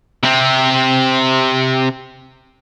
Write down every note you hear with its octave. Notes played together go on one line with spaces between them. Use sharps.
C3 C4